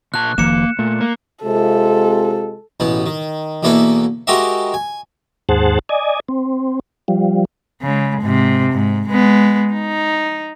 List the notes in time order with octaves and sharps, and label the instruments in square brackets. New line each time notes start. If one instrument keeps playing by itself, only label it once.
[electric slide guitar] A#2 A5 [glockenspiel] F#6
[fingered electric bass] F1 D#3 F3 [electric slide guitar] A#3 [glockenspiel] C#7 E7
[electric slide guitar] A#2 [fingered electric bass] A3
[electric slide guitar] A#3
[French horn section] C3 G#3 F4 [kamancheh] A4
[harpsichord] A1 B2 B3
D#3
E2 B2 A#3 E4 A4 B4
G#3 F#4 G4 A#4 D#5 E5
G#5
[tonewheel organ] D#2 G#2 G#4 C5 F#5 A5
D5 D#5 G#5
C4
F3 G3
[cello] C#3 G#3
G#2 C3
G#2
G#3 B3
D#4